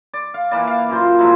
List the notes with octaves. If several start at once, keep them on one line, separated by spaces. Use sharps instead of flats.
D5
F5
E3 A#3 B4 D5
F5
F#2 A#2 C5
G#2 F3 F#3 E4